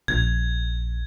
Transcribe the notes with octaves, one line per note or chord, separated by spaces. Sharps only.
A#1 G#6